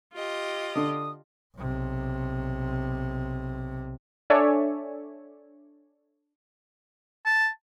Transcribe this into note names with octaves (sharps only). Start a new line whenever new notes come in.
F4 G4 D#5
D3 D#6
B1 C3
D4 A4 C#5 D5 E5 G#5
A5